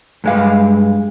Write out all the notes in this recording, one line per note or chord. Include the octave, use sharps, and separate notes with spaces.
G2 G#3 F5